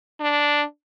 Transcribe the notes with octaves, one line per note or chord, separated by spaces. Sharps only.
D4